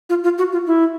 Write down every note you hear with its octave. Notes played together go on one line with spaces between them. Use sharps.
F4
F4
F#4
F4
E4